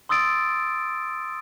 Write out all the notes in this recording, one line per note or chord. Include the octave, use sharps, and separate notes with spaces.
C6 D#6 E6 A6 D7